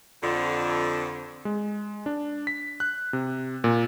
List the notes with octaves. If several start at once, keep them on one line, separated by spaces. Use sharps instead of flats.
F2 D3
G#3
D4
B6
F#6
C3
A#2